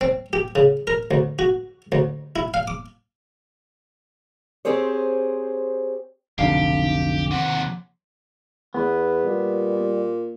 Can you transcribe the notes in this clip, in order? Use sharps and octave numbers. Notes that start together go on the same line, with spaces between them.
C4
G4
C#3
A#4
D2
F#4
D2
E4
F5
D6
C4 G4 G#4 C5 C#5
F1 B1 D3 G4 F5
D#2 C3 F#5
E2 B3
A#2 G3